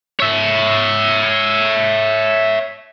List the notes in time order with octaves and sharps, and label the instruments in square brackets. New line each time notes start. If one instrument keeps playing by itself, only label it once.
[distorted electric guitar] C#5 E5